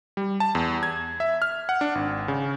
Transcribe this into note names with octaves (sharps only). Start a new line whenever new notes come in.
G3
A5
E2
G#6
E5
F6
F#5
D4
G#1
C#3